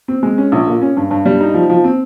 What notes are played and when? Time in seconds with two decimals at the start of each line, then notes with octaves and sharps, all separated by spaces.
0.08 C4
0.23 G#3
0.38 C#4
0.52 A#1
0.67 A#2
0.82 C#4
0.97 G2
1.11 G2
1.25 G3
1.40 D#4
1.54 F3
1.70 F3
1.84 C4